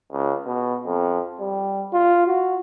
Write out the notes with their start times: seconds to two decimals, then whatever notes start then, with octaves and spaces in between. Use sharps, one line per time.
0.12 C#2
0.46 B2
0.86 F2
1.40 G3
1.93 F4
2.27 F#4